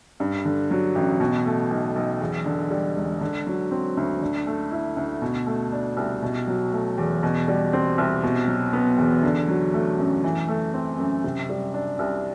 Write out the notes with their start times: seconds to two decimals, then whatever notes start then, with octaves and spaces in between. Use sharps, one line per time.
0.20 G2
0.45 D3
0.71 F#3
0.95 A1
1.20 B2
1.45 A3
1.71 B1
1.96 B1
2.21 E2
2.46 D3
2.71 G3
2.96 E1
3.21 D3
3.47 F#3
3.71 C4
3.97 D2
4.21 D3
4.47 A3
4.71 E4
4.97 D2
5.22 B2
5.47 A3
5.72 D4
5.97 C2
6.22 B2
6.47 F#3
6.72 A3
6.98 E2
7.23 B2
7.48 G3
7.73 C4
7.98 C2
8.23 B2
8.48 F#3
8.73 B3
8.98 E2
9.23 D3
9.48 F#3
9.74 A3
9.99 F#2
10.24 E3
10.48 A3
10.74 C4
10.99 F#2
11.24 C3
11.49 G3
11.74 D4
11.99 C2